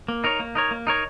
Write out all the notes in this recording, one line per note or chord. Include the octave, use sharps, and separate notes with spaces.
A#3
D#4 A#4 C#5
A#3
D#4 A#4 C#5
A#3
D#4 A#4 C#5